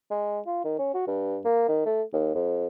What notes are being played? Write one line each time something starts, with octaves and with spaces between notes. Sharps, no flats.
G#3
F4
D#3
C#4
F#4
G2
A#3
D#3
A3
D#2
F2